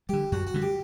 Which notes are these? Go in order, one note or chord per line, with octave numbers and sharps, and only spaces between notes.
D3 G3 G4
F#2 F#4
F#4
D3 G3
G4